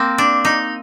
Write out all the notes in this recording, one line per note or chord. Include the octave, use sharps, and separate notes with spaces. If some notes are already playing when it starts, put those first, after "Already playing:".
Already playing: A#3 C4
D4
D#4